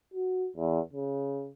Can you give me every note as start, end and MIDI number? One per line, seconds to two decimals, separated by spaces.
0.14 0.48 66
0.57 0.80 40
0.93 1.49 49